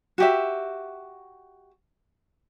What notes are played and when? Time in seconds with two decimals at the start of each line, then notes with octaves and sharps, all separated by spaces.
0.18 F#4 G4 E5